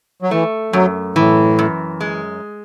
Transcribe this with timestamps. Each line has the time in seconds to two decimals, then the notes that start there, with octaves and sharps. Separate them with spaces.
0.22 F#3
0.31 E3 A3
0.73 F#2 F#3
1.16 A2 E3
1.59 F#2
2.01 G#3